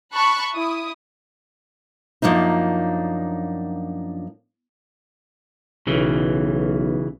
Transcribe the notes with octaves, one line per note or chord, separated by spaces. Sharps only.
A5 B5 C#6 F#6
E4 D#6
F#2 F3 A#3 D4 D#4
B1 C#3 E3